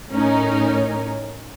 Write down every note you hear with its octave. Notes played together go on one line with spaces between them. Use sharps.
A2 C#4 D#4 A#4